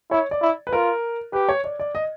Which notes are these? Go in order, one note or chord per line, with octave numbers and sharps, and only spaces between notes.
E4 C#5
D5
E4
B4
F4 A#4
G4 B4
C#5
D5
D5
D#5